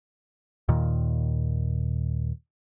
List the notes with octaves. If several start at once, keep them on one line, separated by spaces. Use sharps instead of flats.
D#2 A#2 D#3